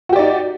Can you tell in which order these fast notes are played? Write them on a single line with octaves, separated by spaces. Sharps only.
F#4 G4 D5 D#4